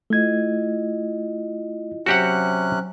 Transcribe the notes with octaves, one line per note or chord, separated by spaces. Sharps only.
A3 E4 F4 D#5 G#6
C3 F#3 C#4 F#4 G4 C5 F#5 F#6